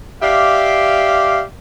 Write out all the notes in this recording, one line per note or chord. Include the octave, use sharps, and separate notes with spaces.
G4 D5 E5 F5